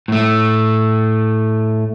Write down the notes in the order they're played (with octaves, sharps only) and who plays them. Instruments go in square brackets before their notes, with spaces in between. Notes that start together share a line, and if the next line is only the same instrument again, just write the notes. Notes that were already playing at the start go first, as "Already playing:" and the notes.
[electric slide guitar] A2 A3